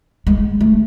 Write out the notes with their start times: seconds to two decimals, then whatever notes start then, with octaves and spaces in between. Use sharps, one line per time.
0.27 G#3
0.61 A3